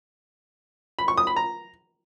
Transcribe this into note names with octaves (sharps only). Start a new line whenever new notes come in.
B5
C#6
D#6
B5
A#5